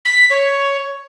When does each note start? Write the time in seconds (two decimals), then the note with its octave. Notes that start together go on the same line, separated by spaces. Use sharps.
0.05 B6
0.30 C#5